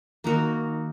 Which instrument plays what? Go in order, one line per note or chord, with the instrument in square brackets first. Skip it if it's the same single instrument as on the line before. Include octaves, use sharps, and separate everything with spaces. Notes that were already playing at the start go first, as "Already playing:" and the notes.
[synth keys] D#3 [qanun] A#3 D#4 F#4 A#4